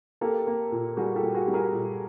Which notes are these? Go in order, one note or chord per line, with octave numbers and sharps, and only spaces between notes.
A#3 G4 A4
A#3
A#2
G3 F#4 G#4
G4 A4
A#2
F#4 G#4
G3
G#4 A#4
A#2